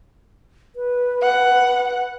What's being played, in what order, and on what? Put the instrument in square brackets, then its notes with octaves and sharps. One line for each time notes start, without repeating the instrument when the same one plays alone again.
[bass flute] B4
[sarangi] F#5